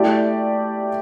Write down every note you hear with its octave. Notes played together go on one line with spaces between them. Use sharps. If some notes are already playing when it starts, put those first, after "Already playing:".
Already playing: A3 E4 G4 D5